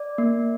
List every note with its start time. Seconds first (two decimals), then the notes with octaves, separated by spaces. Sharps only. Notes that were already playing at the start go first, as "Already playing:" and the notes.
Already playing: D5
0.18 A#3